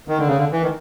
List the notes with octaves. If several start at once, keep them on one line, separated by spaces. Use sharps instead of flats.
D#3
D3
C#3
D3
E3
D#3